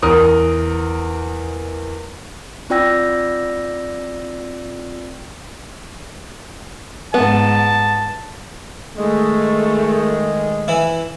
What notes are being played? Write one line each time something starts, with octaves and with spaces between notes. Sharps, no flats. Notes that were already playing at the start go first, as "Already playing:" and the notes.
E2 A#4 D#6
C4 F4 D5 G5 E6 A#6
G#2 B3 A5
D#3 G#3 A3
E3 E4